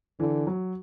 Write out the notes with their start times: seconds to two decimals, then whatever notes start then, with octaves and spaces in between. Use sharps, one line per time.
0.20 D3 E3
0.47 F#3